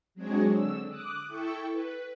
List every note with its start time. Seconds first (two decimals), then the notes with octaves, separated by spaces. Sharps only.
0.15 F#3 G#3 C4 D4 G#4 C#5
0.52 D3 E6
0.89 D6 D#6 F#6
1.27 E4 A4 G5 C#6
1.71 B4